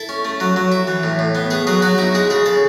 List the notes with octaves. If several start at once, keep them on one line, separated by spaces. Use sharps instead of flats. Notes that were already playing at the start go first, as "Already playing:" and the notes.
Already playing: E4 A4
C#4
A3
F#3
F#3
E4
E3
A2
A2
B3
B3 G#4
F#3 G#4
F#3 F#4
D#4 E4
G#3 G#4
C#3 G#4
C#3 A4